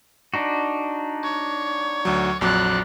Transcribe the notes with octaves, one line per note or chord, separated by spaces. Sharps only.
D4 D#4 F#4
C#5
D2 F#3
A#1 F2 F#3 D5 F#6